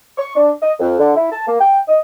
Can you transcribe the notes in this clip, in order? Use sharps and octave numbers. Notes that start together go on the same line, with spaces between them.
C#6
D4
D#5
F2
D3
E4
A5
A#3
G5
D#5